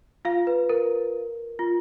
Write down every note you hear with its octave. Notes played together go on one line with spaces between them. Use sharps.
F4 F5
B4
A#4
F4